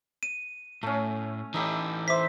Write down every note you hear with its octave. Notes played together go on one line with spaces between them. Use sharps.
D#7
A2 A3 C#4
E3 D#4 E4 G4 A4
C5 E5 D6 B6